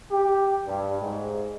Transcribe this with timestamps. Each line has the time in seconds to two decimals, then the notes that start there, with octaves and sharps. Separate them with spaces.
0.10 G4
0.65 G2
1.00 G#2